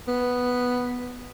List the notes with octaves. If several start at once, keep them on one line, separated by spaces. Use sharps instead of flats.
B3